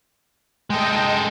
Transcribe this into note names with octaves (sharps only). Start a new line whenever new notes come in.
G#3 A4 D#5 G5